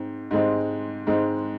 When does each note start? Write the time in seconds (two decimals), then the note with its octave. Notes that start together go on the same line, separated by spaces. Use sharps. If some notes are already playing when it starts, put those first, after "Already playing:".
Already playing: G#2 C4
0.31 G#2 G#3 C4
1.07 G#2 G#3 C4